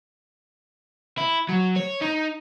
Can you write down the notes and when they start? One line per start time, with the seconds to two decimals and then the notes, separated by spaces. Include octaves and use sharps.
1.18 E4
1.48 F#3
1.76 C#5
2.02 D#4